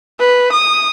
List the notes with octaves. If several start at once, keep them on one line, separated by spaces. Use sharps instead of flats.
B4
D#6